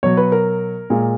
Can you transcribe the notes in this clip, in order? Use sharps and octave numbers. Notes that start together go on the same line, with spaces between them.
B2 F#3 C#5
B4
A#4
A#2 G#3